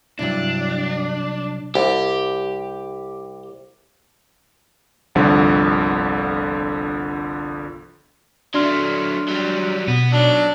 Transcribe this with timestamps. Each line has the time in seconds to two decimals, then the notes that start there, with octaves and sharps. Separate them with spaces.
0.19 C2 G2 F#3 D4 E4
1.75 C2 G4
5.15 G1 C2 D3 F3
8.54 F#3 A3 D4 C6 F6
9.29 F#3 G3
9.88 B2 B3
10.12 B1 F#3 D4